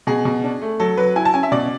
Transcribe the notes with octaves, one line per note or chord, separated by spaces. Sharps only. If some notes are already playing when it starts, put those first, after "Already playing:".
B2 G#4
B2
D4
A3
F#3 A4
F#3 B4
E4 G#5
A5
C#4 G#5
E5
B2 D5